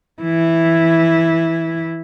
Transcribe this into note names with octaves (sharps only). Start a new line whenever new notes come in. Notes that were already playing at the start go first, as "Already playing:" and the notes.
E3 E4